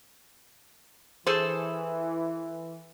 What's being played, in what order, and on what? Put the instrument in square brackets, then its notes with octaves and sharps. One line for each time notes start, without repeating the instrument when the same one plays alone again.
[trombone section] E3 [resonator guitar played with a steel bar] G#4 A4 C5